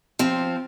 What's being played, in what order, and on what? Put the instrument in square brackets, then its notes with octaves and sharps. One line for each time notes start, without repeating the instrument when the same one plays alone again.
[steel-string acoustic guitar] F3 C4